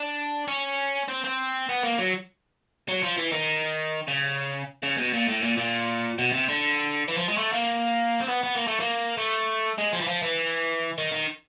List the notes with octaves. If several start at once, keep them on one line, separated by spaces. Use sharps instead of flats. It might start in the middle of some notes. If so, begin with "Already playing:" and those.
Already playing: D4
C#4
C4
C4
B3
A#3
F#3
F#3
F3
E3
D#3
C#3
C#3
B2
A#2
A2
A#2
A#2
B2
C3
D3
E3
F3
G#3
A3
A#3
C4
B3
B3
A#3
A3
A#3
A3
G#3
F3
E3
F3
E3
D#3
D#3